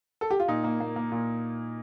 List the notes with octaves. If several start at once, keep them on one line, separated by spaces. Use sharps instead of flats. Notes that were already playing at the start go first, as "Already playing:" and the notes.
A4
G4
F4
A#2 D#4
A#3
A#3
A#3
A#2